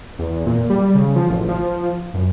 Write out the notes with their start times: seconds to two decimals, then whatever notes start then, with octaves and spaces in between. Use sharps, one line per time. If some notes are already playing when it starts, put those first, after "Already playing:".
0.19 E2
0.46 A#2
0.70 G3
0.95 C#3
1.16 F3
1.30 A1
1.49 F3
2.14 F#2